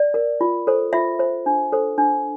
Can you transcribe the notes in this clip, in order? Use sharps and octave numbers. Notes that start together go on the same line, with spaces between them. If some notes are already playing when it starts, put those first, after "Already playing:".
Already playing: D5
A#4
F4
A4 C5
F4 E5
C5
D4
A4 C5
D4